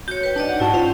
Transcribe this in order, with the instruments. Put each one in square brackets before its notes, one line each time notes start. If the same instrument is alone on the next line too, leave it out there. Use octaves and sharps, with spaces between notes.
[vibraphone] F#4 C#5 [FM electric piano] G6
[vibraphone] B4 G5
[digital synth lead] D4 [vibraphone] D#4 D5 D#5
[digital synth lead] F#5
[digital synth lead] G#2 [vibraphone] E4 G5 [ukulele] F#4 A5
[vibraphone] C#4 [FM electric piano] F4 [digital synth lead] C5